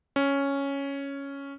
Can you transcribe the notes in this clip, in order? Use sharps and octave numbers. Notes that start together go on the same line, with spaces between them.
C#4